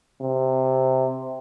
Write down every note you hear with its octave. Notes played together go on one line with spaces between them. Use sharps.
C3